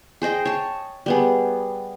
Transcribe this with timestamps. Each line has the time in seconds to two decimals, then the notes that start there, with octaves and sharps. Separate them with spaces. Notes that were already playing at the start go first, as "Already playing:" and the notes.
0.22 G#4 C5 D#5 G5
0.45 C#5 A5
1.06 G3 B3 G#4